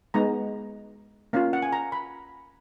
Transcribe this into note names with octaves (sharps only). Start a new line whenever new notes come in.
G#3 B3 D#4 A#5
A#3 C#4 F4 F5
F#5
G#5
A#5
B5